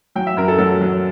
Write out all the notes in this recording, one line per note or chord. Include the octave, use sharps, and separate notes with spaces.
F#3 G5
E5
F#2 A#4
A4
F#3 A4
F#3